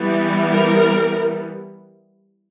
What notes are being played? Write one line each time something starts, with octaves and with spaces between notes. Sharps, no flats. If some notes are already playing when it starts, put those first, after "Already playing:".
Already playing: E3 G3 B3
A#4